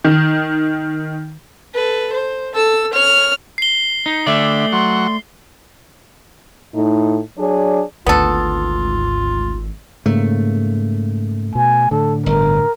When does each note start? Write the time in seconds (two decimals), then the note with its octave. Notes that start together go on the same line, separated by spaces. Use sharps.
0.04 D#3
1.74 A4 B4
2.13 C5
2.54 A4 E6
2.93 C#5 F6
3.58 C7 G7
4.06 D#4
4.27 D3 A3 D5 E5
4.72 F#3 C6 C#6
6.75 A2 D#4
7.38 F#3 D4 G#4 C#5 D5
8.06 G#1 D2 G#2 B3 F4 A4
10.06 G#2 C#3 A3 A#3
11.55 B2 G#5
11.91 A2 D3 A4
12.26 G1 A#4